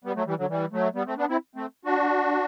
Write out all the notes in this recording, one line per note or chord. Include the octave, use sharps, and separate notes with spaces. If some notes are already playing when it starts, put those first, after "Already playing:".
G3 B3
F#3 A3
E3 G3
D3 F#3
E3 G3
F#3 A3
G3 B3
A3 C4
B3 D4
C4 E4
A3 C4
D4 F#4